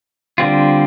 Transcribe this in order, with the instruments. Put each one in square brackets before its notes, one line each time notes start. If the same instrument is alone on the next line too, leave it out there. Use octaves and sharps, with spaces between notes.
[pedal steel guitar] D3 G3 C4 F4